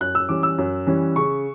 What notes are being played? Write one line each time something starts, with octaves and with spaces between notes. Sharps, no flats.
F#2 F#6
E6
E3 G3 C#4 D6
E6
F#2
E3 G3 C#4
C#3 C#6